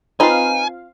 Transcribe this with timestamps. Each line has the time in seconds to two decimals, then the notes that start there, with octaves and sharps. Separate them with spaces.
0.20 C4 D#4 F4 B4 F5 G#5